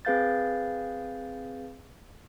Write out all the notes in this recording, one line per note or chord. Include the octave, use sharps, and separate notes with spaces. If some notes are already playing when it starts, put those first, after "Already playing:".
C4 G#4 B4 F5 G6 A6